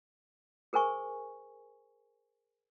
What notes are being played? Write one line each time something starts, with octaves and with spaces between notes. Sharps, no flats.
G#4 A#4 C5 G#5 C#6